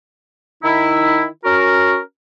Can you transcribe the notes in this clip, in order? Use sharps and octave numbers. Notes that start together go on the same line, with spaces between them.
D#3 D#4 E4
C#4 F#4 A#4